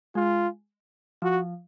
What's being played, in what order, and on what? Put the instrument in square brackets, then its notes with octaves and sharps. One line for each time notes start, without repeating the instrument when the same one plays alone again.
[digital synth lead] G#3 [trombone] F4
[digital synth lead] F3 [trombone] F#4